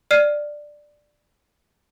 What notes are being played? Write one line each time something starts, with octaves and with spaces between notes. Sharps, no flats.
D5 F6 C7 D#7